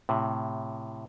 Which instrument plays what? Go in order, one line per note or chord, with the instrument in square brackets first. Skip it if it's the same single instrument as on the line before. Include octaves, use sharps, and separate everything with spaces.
[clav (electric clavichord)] A2 C3